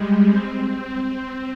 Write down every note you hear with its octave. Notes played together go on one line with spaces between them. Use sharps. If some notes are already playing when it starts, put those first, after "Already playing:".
Already playing: G3 G#3
C4
C4